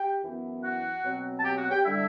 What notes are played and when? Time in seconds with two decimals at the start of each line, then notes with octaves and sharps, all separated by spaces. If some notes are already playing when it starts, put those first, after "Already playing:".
Already playing: G4 G5
0.23 F#2 E3 B3 E4
0.63 F#4 F#5
1.04 B2 F#3 C4
1.38 A5
1.44 G4 G5
1.58 F#4 F#5
1.70 G4 G5
1.84 D3 G3 D4 E4 E5